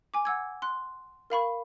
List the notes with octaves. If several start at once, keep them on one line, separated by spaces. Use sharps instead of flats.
G#5 D6
F#5 E6 G#6
C6 F#6
A#4 F5 B5 C#6